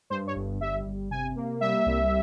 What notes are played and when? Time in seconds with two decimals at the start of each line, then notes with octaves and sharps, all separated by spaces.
0.10 G2 C5
0.27 C#5
0.35 G1
0.61 G3 E5
0.86 G1
1.11 C3 G#5
1.36 A#3
1.61 G3 E5
1.86 C2